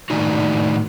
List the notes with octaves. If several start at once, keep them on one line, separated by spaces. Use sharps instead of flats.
A2 D#3 A#3 D4 D#4 F#4